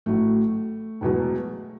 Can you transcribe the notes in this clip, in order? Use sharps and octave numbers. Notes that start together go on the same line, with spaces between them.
A1 A2 F#3 A3
E1 E2 B2 F#3